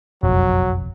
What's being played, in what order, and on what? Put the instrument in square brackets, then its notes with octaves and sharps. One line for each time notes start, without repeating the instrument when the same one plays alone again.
[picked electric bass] F#1 B1 F2 [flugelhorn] F#3